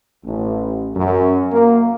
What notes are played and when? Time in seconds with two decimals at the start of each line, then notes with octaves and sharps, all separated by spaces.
0.25 A1
0.95 F#2
1.52 A#3